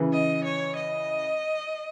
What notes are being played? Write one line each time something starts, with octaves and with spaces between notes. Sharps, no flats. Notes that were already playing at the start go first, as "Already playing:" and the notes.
Already playing: C#3 E3
D#5
C#5
D#5